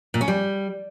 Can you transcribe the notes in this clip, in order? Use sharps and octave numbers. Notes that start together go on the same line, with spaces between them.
A#2
C#4
G3